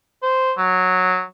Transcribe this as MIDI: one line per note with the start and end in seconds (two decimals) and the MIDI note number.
0.23 0.52 72
0.58 1.22 54